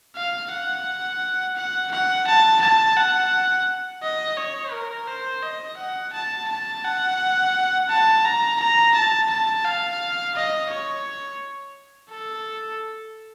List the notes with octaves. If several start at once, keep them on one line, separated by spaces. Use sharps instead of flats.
F5
F#5
F#5
F#5
A5
A5
F#5
D#5
C#5
A#4
C5
D#5
F#5
A5
A5
F#5
A5
A#5
A#5
A5
A5
F5
D#5
C#5
A4